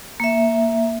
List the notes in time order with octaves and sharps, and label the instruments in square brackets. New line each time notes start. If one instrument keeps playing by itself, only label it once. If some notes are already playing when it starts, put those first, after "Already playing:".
[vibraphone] A#3 E5